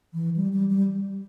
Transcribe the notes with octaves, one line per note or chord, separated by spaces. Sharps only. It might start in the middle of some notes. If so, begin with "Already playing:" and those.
E3
G3
G3
G3